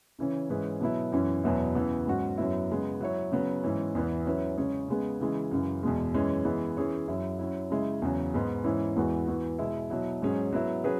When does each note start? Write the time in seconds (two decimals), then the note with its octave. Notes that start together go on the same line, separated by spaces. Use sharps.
0.19 C#3 E3 C#4
0.50 G#2 E3 C#4 G#4 B4
0.80 B2 F#3 B3 E4
1.12 F#2 E3 C#4
1.44 E2 B2 F#3 B3 E4
1.75 C#3 E3 B3
2.07 G#2 F#3 C#4 F#4
2.38 F#2 F#3 B3 E4
2.70 C#3 G#3 B3
3.00 F#3 E4 C#5
3.32 C#3 F#3 B3
3.64 G#2 E3 C#4
3.95 E2 E3 B3
4.25 F#3 C#4 E4 B4
4.57 C#3 G#3 C#4 G#4 C#5
4.88 C#3 G#3 B3 G#4
5.20 C#3 E3 G#3
5.51 F#2 C#3 E3
5.83 E2 B2 G#3
6.14 F#2 E3 G#3 C#4
6.45 E3 G#3 B3
6.77 E3 C#4 G#4 C#5
7.08 F#2 F#3 E4
7.39 F#3 C#4 E4
7.70 C#3 G#3 E4
8.02 E2 C#3 F#3
8.34 G#2 G#3 B3
8.64 G#2 E3 C#4 E4
8.96 E2 E3 G#3 B3 F#4
9.28 E3 B3 F#4
9.59 B2 G#3 E4
9.90 B2 F#3 E4
10.22 G#2 F#3 C#4 G#4
10.52 F#3 B3 E4
10.84 F#3 C#4 G#4 B4